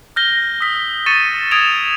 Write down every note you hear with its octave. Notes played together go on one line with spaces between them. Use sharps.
F6 G6 A#6 G7
D#6 E6 B6
C#6 A6 C#7 D#7 E7
D#6 G#6 D7 E7 F7